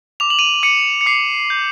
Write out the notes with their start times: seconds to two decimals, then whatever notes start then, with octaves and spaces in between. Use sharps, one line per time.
0.20 D6 F7
0.30 F#7
0.39 D#7 F7
0.63 D6 C#7 D#7
1.01 C#7
1.06 D6 C7
1.50 G6